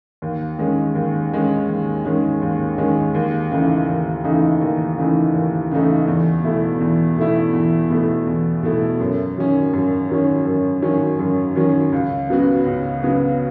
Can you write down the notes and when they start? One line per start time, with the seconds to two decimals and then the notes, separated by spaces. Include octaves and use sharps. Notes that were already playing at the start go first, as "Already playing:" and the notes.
0.22 D#2
0.59 D#3 G#3 C#4
0.95 D#2
1.32 D#3 G#3 C#4
1.68 D#2
2.05 D#3 G#3 C#4
2.42 D#2
2.78 D#3 G#3 C#4
3.15 D#2
3.51 C#3 E3 A3 D#4
3.88 D#2
4.24 C#3 E3 A3 D#4
4.61 D#2
4.98 C#3 E3 A3 D#4
5.34 D#2
5.71 C#3 E3 A3 D#4
6.07 E2
6.44 B2 A3 E4
6.81 E2
7.17 B2 A3 E4
7.53 E2
7.90 B2 A3 E4
8.26 E2
8.63 B2 A3 E4
9.00 F#2
9.36 D#3 F#3 C#4
9.73 F#2
10.10 D#3 F#3 C#4
10.45 F#2
10.82 D#3 F#3 C#4
11.19 F#2
11.56 D#3 F#3 C#4
11.92 C#2
12.29 C#3 F#3 B3 F#4
12.66 C#2
13.02 C#3 F#3 B3 F#4